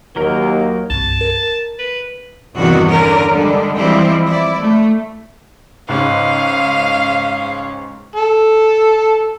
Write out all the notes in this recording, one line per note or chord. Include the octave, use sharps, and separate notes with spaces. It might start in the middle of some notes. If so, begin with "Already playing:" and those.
D#2 F#3 A#3 D#4 A#4
C2 G2 A5
A#4
B4
E2 G2 C3 D#3 F#4
D3 C#4 A#4
D3 G3 G#3
E3 F3 G3 G#3 C4 E4
E4 D5
A3
C#2 G#2 G#3 C#4 F5
A4